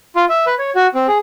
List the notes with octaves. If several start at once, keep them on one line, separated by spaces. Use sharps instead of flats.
F4
E5
B4
C#5
F#4
C4
G#4